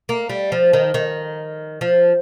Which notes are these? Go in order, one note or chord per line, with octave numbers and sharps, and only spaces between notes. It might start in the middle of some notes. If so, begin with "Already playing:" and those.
A#3
G3
F3
D#3
D#3
F3